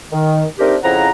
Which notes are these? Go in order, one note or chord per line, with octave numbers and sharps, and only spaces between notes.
D#3
A3 C4 D4 D#4 G4 A#4
F2 C#3 F3 E4 F#5 A#5